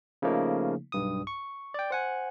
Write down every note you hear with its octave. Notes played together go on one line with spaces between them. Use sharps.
C#3 F3 A3 A#3 D#4
B1 G2 D#6
C#6
D5 G5
C5 F#5 G#5